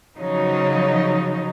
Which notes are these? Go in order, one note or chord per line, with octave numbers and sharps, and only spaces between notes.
C#3 F3 F#3 D#4